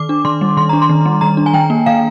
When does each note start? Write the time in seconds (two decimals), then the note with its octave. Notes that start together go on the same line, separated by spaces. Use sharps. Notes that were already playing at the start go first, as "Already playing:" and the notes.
Already playing: D#3 D6
0.09 D4
0.25 D#3 C6
0.41 G3
0.57 D#3 C6
0.69 D4 A#5
0.82 C6
0.89 D#3
1.06 G3
1.21 D#3 A#5
1.37 D4
1.46 G#5
1.53 D#3 G5
1.70 A#3
1.86 D#3 F5